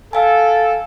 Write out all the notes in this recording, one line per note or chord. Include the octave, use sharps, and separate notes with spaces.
A4 F5 G#5